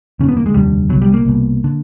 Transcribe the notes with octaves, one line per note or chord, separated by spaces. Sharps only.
F1 D#2 D3 C#4
B3
A#3
G#3
F1 D#2 D3 G3
C2 B2 F#3
G3
A#3
C2 B2
D3